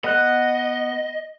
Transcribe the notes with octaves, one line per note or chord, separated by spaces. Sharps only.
B3 D#5 F#6